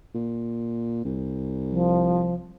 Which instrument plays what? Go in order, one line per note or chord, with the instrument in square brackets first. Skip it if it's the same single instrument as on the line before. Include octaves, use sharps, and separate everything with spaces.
[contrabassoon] A#2
C2
[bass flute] F3